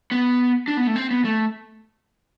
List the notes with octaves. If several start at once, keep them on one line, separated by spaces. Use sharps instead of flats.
B3
D4
B3
A3
C4
B3
A3